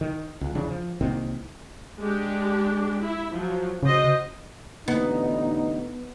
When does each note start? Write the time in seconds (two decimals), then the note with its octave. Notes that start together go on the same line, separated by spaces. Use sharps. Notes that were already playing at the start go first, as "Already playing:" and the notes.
0.01 D#3
0.41 C#2
0.55 E2 C#3 D4
0.69 F3
1.01 C2 A#2 D#3 C4
2.01 G#3 D4 G4
3.00 E4
3.33 F3 F#3
3.83 C#3 F#4 C5 D#5
4.88 A1 D3 B3 D#4